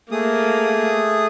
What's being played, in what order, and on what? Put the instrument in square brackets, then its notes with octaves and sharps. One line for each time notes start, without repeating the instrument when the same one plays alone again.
[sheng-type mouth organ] A3 G#4 D#6 [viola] A#3